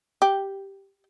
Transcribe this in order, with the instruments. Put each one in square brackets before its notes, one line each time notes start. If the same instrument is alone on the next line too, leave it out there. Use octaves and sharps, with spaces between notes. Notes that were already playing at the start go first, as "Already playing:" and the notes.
[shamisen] G4